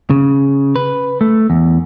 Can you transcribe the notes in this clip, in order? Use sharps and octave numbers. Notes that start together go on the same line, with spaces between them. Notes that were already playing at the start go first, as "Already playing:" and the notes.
C#3
B4
A3
E2